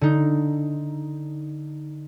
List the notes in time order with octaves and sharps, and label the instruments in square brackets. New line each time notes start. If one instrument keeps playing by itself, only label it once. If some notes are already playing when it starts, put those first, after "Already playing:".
[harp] D3 D#4